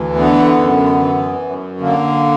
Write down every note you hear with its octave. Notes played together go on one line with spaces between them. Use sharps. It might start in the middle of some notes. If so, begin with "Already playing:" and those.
Already playing: D2 E3
D3 B3
F#2
E3
F#2
D3 A#3